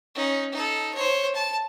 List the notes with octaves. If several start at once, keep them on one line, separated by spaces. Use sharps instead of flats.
C#4 D#4
D#4 A4
C5 C#5
A5